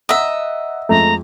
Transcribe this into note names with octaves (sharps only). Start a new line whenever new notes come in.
D#5 E5 F#5 A#5
F2 F3 G#3 A3 A#5